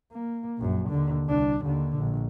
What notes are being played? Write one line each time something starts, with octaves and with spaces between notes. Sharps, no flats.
A#3
A#1 F#2
D#2 D3
C2 D4
D#2 D3
A#1